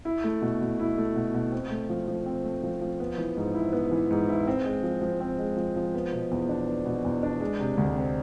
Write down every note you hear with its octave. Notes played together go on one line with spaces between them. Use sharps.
E4
A3
B2
B2
E4
A3
B2
B2
C4
A3
F3
F3
C4
A3
F3
F3
B3
E3
G#2
E4
B3
E3
G#2
E4
C4
G#3
F3
F3
C4
G#3
F3
F3
B3
B2
E2
D4
B3
B2
E2
D4
G#3
C3
D2
C4